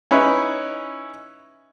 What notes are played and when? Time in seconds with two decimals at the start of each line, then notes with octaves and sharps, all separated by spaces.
0.11 C#4 D#4 E4 B4